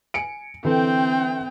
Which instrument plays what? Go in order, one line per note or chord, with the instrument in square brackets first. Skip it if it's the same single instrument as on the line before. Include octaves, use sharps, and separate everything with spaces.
[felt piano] G#5 C#7 D7
[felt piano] D3 E3 A4 [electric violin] C4 G5